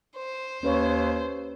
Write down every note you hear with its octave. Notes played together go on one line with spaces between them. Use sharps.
C5
D#2 C#4 B4 C#5